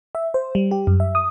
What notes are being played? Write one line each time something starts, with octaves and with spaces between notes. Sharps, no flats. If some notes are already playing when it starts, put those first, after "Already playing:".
E5
C5
G3
G4
F#2
E5
D#6